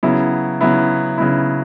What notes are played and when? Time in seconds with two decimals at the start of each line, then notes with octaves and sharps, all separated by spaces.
0.03 C#3 F#3 B3 E4
0.61 C#3 F#3 B3 E4
1.18 C#3 F#3 B3 E4